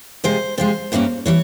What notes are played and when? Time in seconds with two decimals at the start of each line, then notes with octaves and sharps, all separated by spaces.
0.24 C3 F3 G#3 C5
0.58 C3 F3 G#3 C5
0.92 G2 E3 G3 A#3 C#4
1.26 E3 G3 C#5